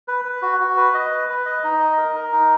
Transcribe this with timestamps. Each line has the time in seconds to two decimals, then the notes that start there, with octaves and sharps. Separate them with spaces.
0.08 B4
0.25 B4
0.42 F#4
0.60 F#4
0.77 B4
0.94 D#5
1.11 B4
1.29 B4
1.46 D#5
1.64 D#4
1.80 D#5
1.98 A#4
2.15 A#4
2.32 D#4